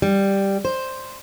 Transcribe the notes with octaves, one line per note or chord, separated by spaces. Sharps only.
G3
C5